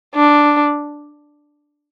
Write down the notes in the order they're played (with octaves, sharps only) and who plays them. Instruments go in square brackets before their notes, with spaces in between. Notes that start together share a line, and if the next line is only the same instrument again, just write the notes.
[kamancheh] D4